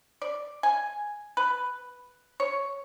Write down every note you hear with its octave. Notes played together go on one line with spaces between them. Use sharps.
D5
G#5
B4
C#5